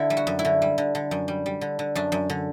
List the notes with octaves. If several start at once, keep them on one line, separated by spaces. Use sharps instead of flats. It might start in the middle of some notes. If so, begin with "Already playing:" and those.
Already playing: D3 E4
G3
F#4
F#2
E4
D3
G3
D3
D3
F#2
G3
G3
D3
D3
F#2 D4
F#2
D3